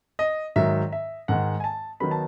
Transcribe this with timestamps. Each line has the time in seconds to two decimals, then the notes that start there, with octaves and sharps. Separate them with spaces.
0.19 D#5
0.56 G#2 D#3 F#3 E5
0.92 E5
1.28 G#2 D#3 G#3 F#5
1.60 G#5
1.64 A5
2.00 D#3 F#3 B3 B5
2.11 A5